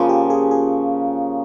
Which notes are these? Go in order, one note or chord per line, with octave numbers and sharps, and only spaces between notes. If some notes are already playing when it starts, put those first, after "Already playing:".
Already playing: C#3 F3 A#3 F4
G4
G#4
G#4